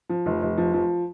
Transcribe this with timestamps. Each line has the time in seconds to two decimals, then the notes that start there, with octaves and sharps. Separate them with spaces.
0.09 F3
0.26 F1
0.42 F1
0.57 F3
0.73 F3